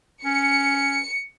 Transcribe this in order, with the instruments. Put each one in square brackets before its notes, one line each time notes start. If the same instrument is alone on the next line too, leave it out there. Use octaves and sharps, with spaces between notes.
[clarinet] C#4 [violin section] C#7